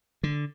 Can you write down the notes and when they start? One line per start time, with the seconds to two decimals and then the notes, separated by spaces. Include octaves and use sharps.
0.23 D3